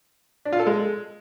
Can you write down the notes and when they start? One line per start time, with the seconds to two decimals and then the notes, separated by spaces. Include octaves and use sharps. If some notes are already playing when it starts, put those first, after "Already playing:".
0.45 D4
0.53 F4
0.60 A4
0.67 G#3